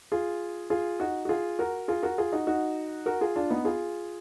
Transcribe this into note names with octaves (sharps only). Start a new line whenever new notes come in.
F4 G#4
F4 G#4
D#4 F#4
F#4
F4 G#4
F#4 A#4
F4 G#4
F#4 A#4
F4 G#4
D#4 F#4
D#4 F#4
F#4 A#4
F4 G#4
D4 F4
B3 D#4
F4 G#4